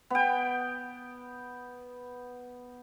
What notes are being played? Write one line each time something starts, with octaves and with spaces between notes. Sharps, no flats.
B3 G5